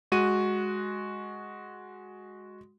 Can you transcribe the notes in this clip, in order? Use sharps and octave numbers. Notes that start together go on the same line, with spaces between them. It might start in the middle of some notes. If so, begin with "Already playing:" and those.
G#3 F#4 D#7